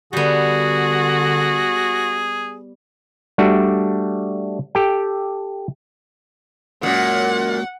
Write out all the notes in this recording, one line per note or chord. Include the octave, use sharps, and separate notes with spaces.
D3 G3 B3 F#4 G#4
G3 A3 D4 F#4
G4 A4 G5
F#2 A#2 G#3 A#3 F#4 F#5